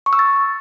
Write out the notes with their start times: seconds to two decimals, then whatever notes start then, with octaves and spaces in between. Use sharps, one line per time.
0.06 C#6
0.13 E6
0.19 A6